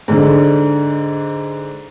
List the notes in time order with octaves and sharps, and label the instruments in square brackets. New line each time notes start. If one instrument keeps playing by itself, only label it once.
[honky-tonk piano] G#2 D3